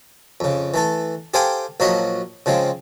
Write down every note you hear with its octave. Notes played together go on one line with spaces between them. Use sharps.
F2 C#3
E3 A3 A4
G4 A4 C5 F5 G5 G#5
A#1 F3 F#3 F#4 D#5 B5
C#3 F3 G#3 C4